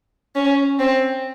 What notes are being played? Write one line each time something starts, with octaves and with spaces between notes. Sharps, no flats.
C#4
C4